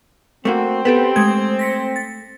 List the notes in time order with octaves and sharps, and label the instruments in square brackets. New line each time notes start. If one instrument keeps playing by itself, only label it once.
[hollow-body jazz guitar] A3 A#3 F#4 [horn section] C4
[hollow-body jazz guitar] B3 [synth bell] G4 A4 B4
[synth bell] G#3 G#6 [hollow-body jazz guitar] A3
[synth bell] A#6 B6 C#7
A6